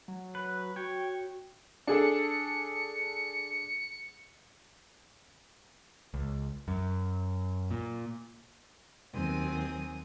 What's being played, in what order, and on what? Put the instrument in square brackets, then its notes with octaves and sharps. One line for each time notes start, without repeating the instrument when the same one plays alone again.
[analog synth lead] F#3
[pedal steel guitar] B4
[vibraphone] F#4 [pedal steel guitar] C#5 [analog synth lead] G5
[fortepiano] D4 G#4 A4 [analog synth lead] C#7
[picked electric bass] C#2
F#2
A#2
[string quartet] D#2 F#3 C4 G#5 D#6